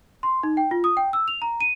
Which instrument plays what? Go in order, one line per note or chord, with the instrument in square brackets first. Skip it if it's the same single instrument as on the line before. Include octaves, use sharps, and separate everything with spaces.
[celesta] C6
D#4
G5
F4
D#6
G5
E6
F7
A#5
D#7